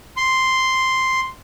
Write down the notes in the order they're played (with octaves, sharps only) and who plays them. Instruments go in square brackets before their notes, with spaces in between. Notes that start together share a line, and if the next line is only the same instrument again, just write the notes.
[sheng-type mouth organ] C6